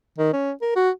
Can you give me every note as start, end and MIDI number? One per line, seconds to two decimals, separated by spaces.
0.18 0.33 51
0.33 0.52 61
0.62 0.73 70
0.76 0.90 66